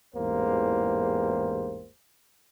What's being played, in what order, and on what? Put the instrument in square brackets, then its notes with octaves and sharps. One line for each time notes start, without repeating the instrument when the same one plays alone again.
[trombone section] A1 E2 G#2 A#3 G4 C5